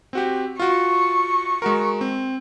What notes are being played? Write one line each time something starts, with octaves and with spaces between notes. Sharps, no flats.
C4 F#4 G4
F4 F#4 C#6
G#3 F#4 A#4
C4